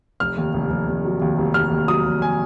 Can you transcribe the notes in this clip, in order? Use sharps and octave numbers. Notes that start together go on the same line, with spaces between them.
F1 F6
D#2
F1
F1
F1
F#3
D#2
F1
D#2 F6
D#2
F#3 D#6
F1
G#5